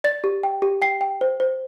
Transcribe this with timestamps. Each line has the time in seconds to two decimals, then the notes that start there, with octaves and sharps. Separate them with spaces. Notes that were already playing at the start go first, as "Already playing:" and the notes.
0.04 D5 A6
0.24 G4
0.43 G5
0.62 G4
0.82 G5 C7
1.01 G5
1.21 C5
1.40 C5